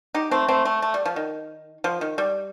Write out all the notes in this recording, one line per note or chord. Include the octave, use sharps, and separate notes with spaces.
D#4 G4
A3 C4
A3 C4
A3
A3
G3
F3
D#3
F3
D#3
G3